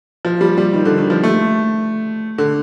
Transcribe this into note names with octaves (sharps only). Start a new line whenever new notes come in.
F3
G3
G3
D#3
D3
D#3
F3
A3
D3